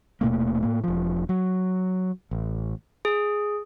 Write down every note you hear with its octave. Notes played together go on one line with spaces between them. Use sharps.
D#1 B2 A3 A#3
A2 A#3
E1 F3
F#3
A1
G#4